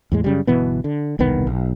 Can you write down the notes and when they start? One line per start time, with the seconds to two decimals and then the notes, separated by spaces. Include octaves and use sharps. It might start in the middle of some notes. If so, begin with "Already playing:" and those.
0.12 E2 A2 G#3
0.24 F#2 C#3 G3
0.47 G1 B2 E3 B3
0.84 D3
1.19 E1 C2 D#3 B3
1.47 B1